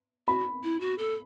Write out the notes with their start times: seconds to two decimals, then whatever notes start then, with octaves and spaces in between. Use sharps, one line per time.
0.28 F#4 B5
0.64 E4
0.80 F#4
0.98 A4